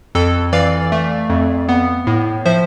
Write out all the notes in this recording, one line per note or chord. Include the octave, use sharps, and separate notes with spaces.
F2 A4
E3 D5 F5
A3
F2
B3
A2
F3 C5 E5